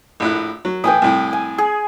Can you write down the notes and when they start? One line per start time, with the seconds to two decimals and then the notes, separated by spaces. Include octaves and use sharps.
0.20 A#1 A2 F#6
0.65 F#3
0.84 A2 E3 G5 G#5 D#6
1.02 C2 A2
1.33 G#5
1.58 G#4